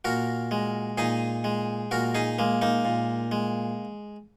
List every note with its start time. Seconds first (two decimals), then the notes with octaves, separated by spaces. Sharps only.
0.05 A#2 F#4 A#4
0.51 G#3
0.98 A#2 D#4 G#4
1.44 G#3
1.91 A#2 F#4 A#4
2.15 D#4 G#4
2.39 G#3 A#3
2.62 A#3 D#4
2.85 A#2
3.32 G#3